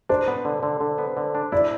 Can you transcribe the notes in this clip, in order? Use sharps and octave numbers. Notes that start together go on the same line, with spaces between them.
D4 C5
B3
D3
D3
D3
B3
D3
D4
E4 D5